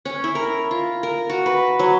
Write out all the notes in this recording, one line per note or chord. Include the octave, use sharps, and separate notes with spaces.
C#4
E4
A#4
F4
A#4
F#4
B4
F#3